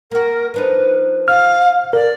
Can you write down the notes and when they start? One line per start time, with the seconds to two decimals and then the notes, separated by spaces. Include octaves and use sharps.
0.11 A#3 F#4 A#4
0.54 F3 D4 D#4 B4
1.28 F5 F6
1.93 A#4 D5